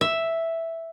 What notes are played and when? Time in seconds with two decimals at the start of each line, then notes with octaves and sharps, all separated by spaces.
0.01 E5